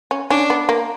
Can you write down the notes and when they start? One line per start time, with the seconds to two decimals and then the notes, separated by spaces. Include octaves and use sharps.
0.11 C#4
0.30 C#4 D4
0.50 B3
0.69 A#3